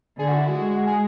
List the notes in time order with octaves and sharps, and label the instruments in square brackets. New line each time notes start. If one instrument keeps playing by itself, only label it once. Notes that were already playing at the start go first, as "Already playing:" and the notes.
[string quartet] D3 [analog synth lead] G#4
[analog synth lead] F#4
E4
F#4
[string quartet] G#3
[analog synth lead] G#4